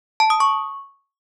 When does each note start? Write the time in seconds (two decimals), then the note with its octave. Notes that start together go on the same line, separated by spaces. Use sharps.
0.20 A5
0.30 D#6
0.40 C#6